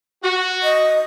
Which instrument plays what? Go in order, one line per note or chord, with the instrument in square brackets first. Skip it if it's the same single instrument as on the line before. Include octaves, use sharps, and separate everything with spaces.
[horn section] F#4
[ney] D#5